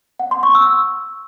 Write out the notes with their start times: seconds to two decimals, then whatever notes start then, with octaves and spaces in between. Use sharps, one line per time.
0.19 F#5
0.31 C6
0.43 C#6
0.55 E6